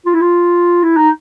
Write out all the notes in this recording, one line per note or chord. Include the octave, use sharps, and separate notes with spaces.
F4
E4
F4
E4
D#4